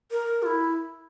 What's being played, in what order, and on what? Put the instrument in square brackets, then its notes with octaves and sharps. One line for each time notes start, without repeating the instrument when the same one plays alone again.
[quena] A#4
F4
E4